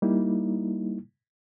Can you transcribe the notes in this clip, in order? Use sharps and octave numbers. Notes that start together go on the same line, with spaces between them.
G3 A#3 D#4 E4